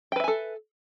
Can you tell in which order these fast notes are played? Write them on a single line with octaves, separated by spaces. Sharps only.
G5 B4 E5 G#5 A4